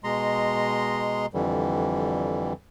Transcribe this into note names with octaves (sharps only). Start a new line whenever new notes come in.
B2 G#3 D#5 A#5 C6
F2 D3 E3 G3